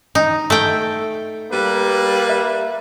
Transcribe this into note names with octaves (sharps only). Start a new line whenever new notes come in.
D#4
A3 G5
G3 A#3 B4
E5